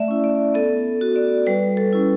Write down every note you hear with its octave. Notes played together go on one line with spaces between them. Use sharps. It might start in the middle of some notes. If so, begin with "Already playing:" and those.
Already playing: A3 D5 E5
C#4 E4
D5
B3 A4
F#4
D5
G3 B4
A4
C#4 E4